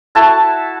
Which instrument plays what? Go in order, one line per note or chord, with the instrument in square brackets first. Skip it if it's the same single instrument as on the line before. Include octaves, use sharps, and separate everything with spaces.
[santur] E4 F#4 A4 A5